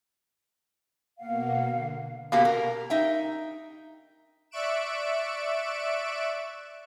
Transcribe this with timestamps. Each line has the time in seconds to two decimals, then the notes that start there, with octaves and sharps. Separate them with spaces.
1.19 B2 A#3 F5 F#5
1.62 D3
2.32 B2 A#3 G4 F5
2.45 A#4
2.90 D#4 E5 G5
4.51 D5 E5 C#6 F#6 D7 E7